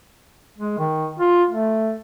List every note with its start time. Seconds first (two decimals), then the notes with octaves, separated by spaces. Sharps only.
0.58 G#3
0.79 D#3
1.19 F4
1.50 A3